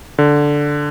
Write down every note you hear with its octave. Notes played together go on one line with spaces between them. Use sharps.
D3